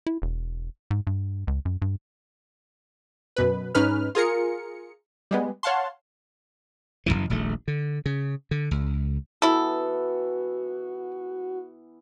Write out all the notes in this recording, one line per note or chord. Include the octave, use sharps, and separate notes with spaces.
E4
E1
G#2
G2
C#2
F#2
G2
F#2 B2 B4
G#2 C#4 D#4 B4 F6
F4 G#4 A#4 C#7
G3 G#3 B3
C#5 F5 F#5 A5 C6
F#1 C#2 F#2 E3
D#1 A#1 A3
D3
C#3
D3
C#2
E3 B3 E4 F#4 A4